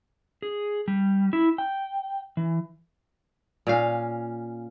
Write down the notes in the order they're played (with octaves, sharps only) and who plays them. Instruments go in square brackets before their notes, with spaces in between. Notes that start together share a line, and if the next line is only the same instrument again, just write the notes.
[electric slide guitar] G#4
G3
E4
G5
E3
[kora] A#2 C#4 F5